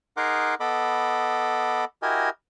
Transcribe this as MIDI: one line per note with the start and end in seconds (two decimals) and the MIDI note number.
0.17 0.55 63
0.17 0.55 68
0.17 0.55 70
0.17 0.55 78
0.17 0.55 84
0.17 0.55 86
0.60 1.85 59
0.60 1.85 69
0.60 1.85 75
0.60 1.85 83
0.60 1.85 86
2.02 2.30 64
2.02 2.30 66
2.02 2.30 67
2.02 2.30 70
2.02 2.30 75
2.02 2.30 80